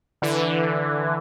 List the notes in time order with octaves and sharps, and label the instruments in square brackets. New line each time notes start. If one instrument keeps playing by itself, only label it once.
[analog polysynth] D3 E3